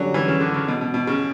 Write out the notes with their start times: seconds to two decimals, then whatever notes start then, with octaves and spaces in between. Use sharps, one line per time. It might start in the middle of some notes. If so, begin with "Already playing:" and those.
Already playing: D3 F#3 G3 C#4
0.14 E3
0.28 C#3
0.41 D3
0.54 C#3
0.68 B2
0.81 B2
0.94 B2
1.07 C#3